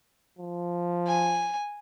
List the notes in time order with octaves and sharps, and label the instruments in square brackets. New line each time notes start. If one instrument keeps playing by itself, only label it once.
[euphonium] F3
[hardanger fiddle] G#5